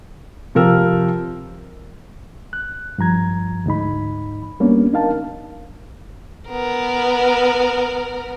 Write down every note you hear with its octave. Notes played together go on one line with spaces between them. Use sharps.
C3 F3 A#4 E6
F#6
G2 F3 A#5 G#6
D2 G#2 D#4 B5
G3 A#3 B3 C#4 D4
D4 D#4 A#4 F5 A5
B3 A#4